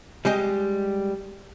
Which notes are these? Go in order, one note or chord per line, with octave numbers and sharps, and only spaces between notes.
G3 G#3 G4 D#5